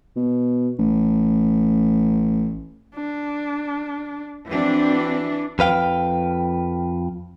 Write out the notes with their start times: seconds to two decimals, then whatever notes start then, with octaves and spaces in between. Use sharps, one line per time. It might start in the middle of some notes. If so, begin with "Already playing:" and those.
0.16 B2
0.79 A1
2.94 D4
4.50 E3 C4 D4 F#4
5.59 F2 B4 F5 G5